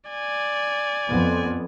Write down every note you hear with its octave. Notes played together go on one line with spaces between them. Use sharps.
D5 G#5
F2 B3